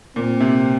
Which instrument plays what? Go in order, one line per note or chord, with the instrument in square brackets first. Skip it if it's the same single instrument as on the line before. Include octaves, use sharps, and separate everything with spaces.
[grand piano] A#2 [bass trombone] C4
[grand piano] C3